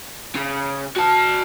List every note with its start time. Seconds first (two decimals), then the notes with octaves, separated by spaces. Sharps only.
0.36 C#3
0.96 F#4 A5